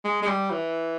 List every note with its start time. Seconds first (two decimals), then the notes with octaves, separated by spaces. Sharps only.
0.05 G#3
0.23 G#3
0.27 G3
0.51 E3